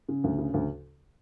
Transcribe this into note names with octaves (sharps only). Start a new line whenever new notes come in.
C#3
D2
C#3
D2